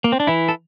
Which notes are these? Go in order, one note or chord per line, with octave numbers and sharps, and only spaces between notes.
A#3
C4
D4
E3 E4
A4